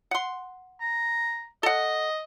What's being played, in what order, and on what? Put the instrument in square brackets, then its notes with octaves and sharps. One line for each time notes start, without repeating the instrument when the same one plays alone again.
[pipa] F#5 C6
[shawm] A#5
[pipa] A4 F#5 [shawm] D#5